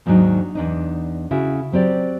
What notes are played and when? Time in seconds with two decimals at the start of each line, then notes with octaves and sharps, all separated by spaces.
0.06 D#2 G#2 D#3 F#3 D4 D#4
0.55 E2 D4 D#4
1.31 C#3 E4 F#4
1.72 F#3 C4 G4 D5